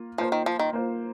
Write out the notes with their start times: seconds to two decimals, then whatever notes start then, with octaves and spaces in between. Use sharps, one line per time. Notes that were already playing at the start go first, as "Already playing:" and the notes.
Already playing: A#3 F4
0.18 F3 A#3 F4 C5
0.32 D#3
0.46 F3
0.59 D#3
0.73 A#3 F4 C5